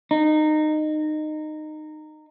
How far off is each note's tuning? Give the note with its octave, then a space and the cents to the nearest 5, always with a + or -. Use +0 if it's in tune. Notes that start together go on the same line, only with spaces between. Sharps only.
D#4 -20